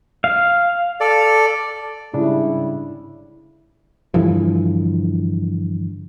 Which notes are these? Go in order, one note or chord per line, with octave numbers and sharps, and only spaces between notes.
F5
A4 D5
G#2 C#3 G3 D4 E4
G2 D3 E3 F3